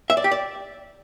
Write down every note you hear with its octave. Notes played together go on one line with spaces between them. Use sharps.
E5
D5
G4
D5